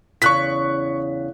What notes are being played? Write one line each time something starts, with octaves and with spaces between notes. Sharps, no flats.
E2 C#3 C#6 F#6 B6